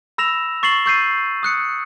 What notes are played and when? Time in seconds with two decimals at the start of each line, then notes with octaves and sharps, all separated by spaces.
0.18 B5 E6 A#6 E7 F7
0.63 C#6 A6 C7 E7 F#7
0.86 C#6 E6 G6 A6 C7 D#7
1.43 D#6 F#6 C#7